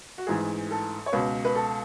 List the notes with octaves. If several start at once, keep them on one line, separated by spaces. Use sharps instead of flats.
F#4
A1 G#2 E3 G#4
A4
C#5
C#2 B2 B4
B4
A4